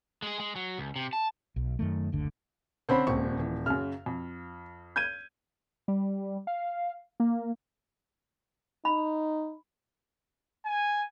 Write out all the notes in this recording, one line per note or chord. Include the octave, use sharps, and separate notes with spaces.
G#3 G#4
G#3
F#3
C#2
C3
A5
B1
F#2 D#3 A3
F#1 D2 D3
D3 C4 C#4 C5 B5
D#1 C#2 C4 C#6
E3
F#2 C#3 F6
F2
G6 G#6 D#7
G3
F5
A#3
D#4 B5
G#5